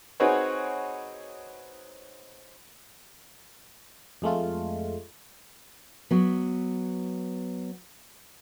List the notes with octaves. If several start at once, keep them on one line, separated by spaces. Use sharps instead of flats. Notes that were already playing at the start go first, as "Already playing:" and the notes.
C4 D#4 F#4 G#4 B4 C#5
F2 G#3 A3 F4
F#3 B3